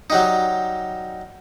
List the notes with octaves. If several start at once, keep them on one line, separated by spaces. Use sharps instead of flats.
F#3 G3 D#4